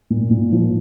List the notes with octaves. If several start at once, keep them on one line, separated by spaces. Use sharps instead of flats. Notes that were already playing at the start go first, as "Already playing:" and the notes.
A#2
A#2
F3